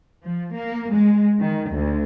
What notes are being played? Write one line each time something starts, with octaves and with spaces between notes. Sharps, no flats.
F3
A#3
G#3
D#3
D2